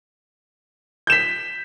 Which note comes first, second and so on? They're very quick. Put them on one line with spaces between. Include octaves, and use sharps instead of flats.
G6 E7 B6